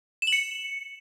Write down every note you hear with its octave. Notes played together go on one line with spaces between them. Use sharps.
E7
F#7
C#7